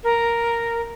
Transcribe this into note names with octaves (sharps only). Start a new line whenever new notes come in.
A#4